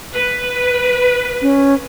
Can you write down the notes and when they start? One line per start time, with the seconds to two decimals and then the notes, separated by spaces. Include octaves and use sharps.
0.13 B4
1.42 C#4